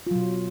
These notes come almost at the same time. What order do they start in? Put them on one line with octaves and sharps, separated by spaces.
F4 F#3 B2